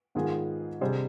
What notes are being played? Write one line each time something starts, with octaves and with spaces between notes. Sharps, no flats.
G#2 D#3 B3 F4 G#4
C3 G3 D4 G#4 C5